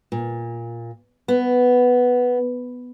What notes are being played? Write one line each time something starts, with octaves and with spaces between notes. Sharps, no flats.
A#2
B3